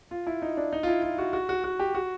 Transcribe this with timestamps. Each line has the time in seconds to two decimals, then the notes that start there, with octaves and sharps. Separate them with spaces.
0.11 F4
0.27 E4
0.42 D#4
0.57 D4
0.73 D#4
0.83 F4
0.88 E4
1.03 F4
1.18 F#4
1.33 F#4
1.49 F#4
1.64 F#4
1.79 G4
1.95 F#4